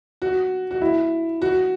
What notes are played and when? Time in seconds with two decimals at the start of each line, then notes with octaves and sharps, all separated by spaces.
0.22 F#4
0.71 F#4
0.81 E4
1.42 F#4